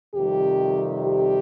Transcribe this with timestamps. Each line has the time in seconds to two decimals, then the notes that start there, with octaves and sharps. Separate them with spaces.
0.14 F2 C3 D#3 G3 G4
1.03 G4